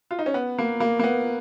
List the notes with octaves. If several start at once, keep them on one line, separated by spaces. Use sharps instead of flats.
F4
D#4
C#4
B3
A#3
A#3
A#3
B3